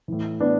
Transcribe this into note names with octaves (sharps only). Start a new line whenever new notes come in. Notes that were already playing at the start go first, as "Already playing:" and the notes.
A2 E3
B3 D4